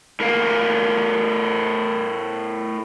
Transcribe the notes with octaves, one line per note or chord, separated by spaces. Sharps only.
A2 A#4 F5